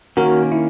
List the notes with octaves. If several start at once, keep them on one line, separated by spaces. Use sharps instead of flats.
D#3 A#3 C#4 F#4 A#4
E4